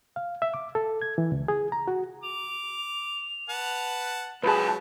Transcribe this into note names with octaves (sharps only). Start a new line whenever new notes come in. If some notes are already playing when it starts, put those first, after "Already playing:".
F5
E5
D6
A4
G#6
E3
C#2
G#4
A#5
F#4
D6 F7
B4 F#5 A5
C#2 F#3 G#4 B4 A5 G6